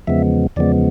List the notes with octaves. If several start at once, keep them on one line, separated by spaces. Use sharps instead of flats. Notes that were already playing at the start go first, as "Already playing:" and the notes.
E2 C#3 F3 G#3 B3 E5
E2 C#3 F3 G#3 B3 D5